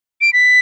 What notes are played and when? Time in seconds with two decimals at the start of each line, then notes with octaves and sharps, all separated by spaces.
0.21 D7
0.33 B6